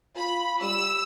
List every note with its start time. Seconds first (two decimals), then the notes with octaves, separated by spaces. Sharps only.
0.17 F4 B5
0.61 G3 E6